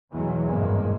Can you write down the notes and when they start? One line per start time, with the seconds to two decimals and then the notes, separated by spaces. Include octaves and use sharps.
0.11 E2 B2 E3 F#3 G#3
0.46 G#1 E2 G2 B2 G#3 A#3